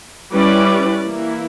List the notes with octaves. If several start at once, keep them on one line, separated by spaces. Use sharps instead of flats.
G3 C#4 E4 B4 D5
E3 A#3 E4